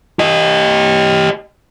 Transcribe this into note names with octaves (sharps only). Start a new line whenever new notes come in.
G4 D#5